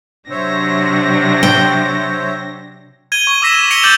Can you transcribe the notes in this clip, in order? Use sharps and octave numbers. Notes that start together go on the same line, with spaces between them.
C3 F#3 D4 C5 C#5 E5 A#6
G5
G#6 D#7 G7
C#6
D6 E6 A#6 B6 E7 G7
G#6 B6 C#7 D7 F7 G7
D6 G6 A6 F7 F#7